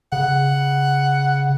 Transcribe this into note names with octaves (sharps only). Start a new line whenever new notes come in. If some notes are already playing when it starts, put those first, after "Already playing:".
C#3 F#5